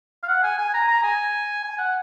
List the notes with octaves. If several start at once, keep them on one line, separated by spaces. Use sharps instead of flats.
F5
F#5
G#5
G#5
A#5
A#5
G#5
G#5
F#5